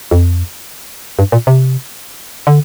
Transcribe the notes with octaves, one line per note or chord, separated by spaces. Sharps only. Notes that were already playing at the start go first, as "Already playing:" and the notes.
F2
G2
A#2
C3
D3